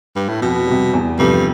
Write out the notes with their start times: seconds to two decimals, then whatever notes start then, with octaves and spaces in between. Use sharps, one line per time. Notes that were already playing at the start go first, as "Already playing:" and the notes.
0.16 G2
0.29 A2
0.42 F2 B2
0.67 C3 G3
0.94 E2
1.19 G2 C3 F3 A3